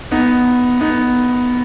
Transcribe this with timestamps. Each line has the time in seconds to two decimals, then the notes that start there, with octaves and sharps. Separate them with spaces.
0.11 B3 D#4
0.81 B3 D#4